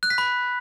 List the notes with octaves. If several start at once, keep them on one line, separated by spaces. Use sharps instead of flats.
F#6
B6
B5